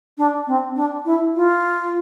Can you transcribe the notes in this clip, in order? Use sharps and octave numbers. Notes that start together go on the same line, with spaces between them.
D4
C4
D4
E4
F4